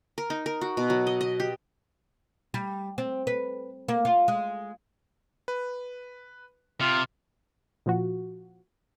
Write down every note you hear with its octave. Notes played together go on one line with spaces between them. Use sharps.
A#4
D#4
A#4
F#4
B2
F#3
D#5
D#5
G4
G3
C4
B4
A#3
F4
G#3
B4
C3 F4
A#2 F3 F#4